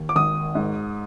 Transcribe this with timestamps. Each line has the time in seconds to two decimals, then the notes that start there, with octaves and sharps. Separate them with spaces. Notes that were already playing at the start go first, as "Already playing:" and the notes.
Already playing: D#2
0.09 D6
0.16 G#1 D#6
0.55 G#2